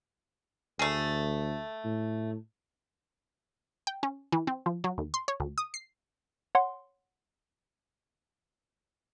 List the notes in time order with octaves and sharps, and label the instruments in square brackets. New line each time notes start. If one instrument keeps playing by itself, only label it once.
[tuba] D2 [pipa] A3 G#4
[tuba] A2
[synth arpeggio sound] G5
C#4
E3
C4
F3
F#3
D#2
C6
C#5
D2
D#6
C7
C#5 F#5 C6